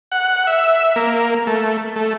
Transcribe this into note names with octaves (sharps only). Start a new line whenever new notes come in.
F#5
E5
A#3
A3
A3